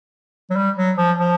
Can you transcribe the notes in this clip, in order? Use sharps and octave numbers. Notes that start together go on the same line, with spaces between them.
F#3
G3
F#3
F3
F3